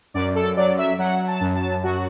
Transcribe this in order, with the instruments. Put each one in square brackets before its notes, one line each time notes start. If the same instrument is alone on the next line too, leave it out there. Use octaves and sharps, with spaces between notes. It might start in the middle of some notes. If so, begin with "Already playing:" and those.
[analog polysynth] F#2 D5
A4
F#3 D5
E5
F#3 F#5
A5
F#2
A5
F#3 F#4